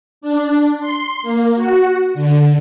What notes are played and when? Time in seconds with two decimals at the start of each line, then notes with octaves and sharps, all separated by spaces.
0.21 D4
0.80 C6
1.22 A#3
1.56 F#4
2.14 D3